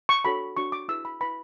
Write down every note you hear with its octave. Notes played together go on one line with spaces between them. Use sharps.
C#6
D4 F#4 A4 C#5 B5
D4 F#4 C#5 C#6
D6
E4 G#4 B4 E6
B5
E4 B4 B5